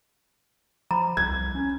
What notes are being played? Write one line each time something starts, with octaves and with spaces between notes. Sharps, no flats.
F3 A#5 B5
C2 G#6
C#4